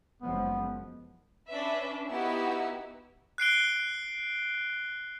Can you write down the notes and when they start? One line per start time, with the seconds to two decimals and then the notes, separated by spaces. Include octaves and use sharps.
0.22 F#1 F3 G#3 B3
1.50 C#4 D4 B4 E5
2.09 B3 D#4 E4 F#4 G4 E6
3.38 F#6 C7 D7 G7